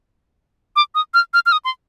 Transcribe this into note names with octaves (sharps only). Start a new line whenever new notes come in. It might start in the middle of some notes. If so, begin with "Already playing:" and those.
D6
D#6
F6
F6
F6
D#6
C6